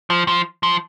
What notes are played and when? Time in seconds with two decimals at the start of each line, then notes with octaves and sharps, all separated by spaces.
0.10 F3
0.28 F3
0.63 F3